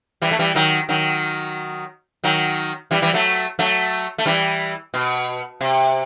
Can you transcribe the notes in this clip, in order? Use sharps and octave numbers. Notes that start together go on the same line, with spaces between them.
E3 G3
A3
E3 G3
D#3 F#3
D#3 F#3
D#3 F#3
E3 G3
E3 G3
F#3 A3
F#3 A3
A3
E3 G3
B2
C3